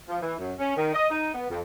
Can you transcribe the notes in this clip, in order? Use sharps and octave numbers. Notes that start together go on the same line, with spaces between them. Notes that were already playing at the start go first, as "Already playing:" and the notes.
F3
E3
F#2
C#4
D#3
D#5
D#4
B3
F2